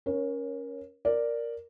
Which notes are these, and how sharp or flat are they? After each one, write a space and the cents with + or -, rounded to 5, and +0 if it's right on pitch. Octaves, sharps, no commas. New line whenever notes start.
C#4 +0 A#4 +20 C#5 -10
A#4 +0 D5 +0